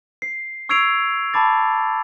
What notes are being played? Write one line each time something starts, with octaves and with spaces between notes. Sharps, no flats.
C7
C#6 E6 G#6 C7 D7 F7
A5 B5 D6 A6